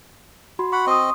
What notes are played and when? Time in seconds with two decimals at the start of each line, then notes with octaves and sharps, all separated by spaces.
0.59 F#4 B5 C6
0.72 F#5 B5 C#6
0.87 C4 D#5 C6 D#6